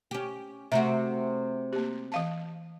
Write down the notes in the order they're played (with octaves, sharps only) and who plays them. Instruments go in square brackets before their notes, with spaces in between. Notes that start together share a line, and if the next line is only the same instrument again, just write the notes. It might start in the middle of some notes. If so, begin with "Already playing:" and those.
[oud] C#4 G4
[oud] C3 A3 F#4 [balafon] E5 A#5
[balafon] A#3 G4
E3 F5 A5